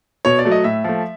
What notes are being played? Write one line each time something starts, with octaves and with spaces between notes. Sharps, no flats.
B2 C#5
D5
F#3 A3
D#5
A2 E5
F3 A3